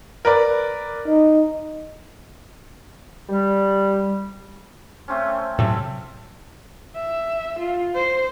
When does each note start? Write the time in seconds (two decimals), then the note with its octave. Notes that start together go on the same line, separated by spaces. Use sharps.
0.25 A#4 B4 D5
1.08 D#4
3.29 G3
5.08 A3 C4 C#4
5.59 A2 C3 F#3 A4 E5
6.95 E5
7.60 F4
7.95 C5